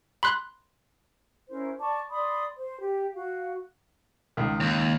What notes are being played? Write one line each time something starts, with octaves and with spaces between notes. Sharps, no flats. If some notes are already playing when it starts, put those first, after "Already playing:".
B5 C6 F#6
C#4 E4 A#4 C5
D5 A5 C#6 D6
D5 B5 C6 D#6
C5
G4
F#4 F5
C#2 D#3
D#2